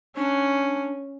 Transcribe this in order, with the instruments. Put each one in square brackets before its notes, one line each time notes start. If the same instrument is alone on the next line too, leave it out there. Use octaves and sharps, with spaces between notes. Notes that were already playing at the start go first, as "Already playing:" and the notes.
[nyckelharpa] C#4 [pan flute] D4